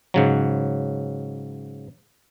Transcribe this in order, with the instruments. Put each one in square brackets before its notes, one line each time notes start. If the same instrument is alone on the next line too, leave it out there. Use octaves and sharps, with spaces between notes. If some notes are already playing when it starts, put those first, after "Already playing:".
[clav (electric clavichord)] G#2 C#3 F#3